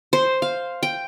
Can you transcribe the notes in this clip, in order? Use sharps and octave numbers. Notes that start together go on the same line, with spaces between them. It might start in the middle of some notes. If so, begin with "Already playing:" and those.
C5
F5
G5